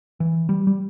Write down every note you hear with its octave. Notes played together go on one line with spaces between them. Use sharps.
E3
G3
G3